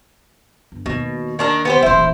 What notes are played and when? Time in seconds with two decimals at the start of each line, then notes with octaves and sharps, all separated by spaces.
0.72 G1
0.86 D#2 B2
1.39 D#3 D4 A#4
1.65 B3 G4 C5
1.83 D#1 A1 E4 C5